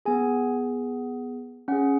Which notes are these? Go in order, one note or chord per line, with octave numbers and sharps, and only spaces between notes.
B3 G#4 G#5
C#4 G#4 F#5